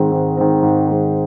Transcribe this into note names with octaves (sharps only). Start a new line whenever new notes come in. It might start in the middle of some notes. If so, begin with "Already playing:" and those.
Already playing: G#2 D#3 G#3 C4
G#2
D#3 G#3 C4
G#2
D#3 G#3 C4